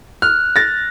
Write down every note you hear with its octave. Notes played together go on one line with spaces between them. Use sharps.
F6 F#6
A6 A#6